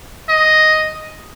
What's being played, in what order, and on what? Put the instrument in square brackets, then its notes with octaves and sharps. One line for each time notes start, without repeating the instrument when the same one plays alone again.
[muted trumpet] D#5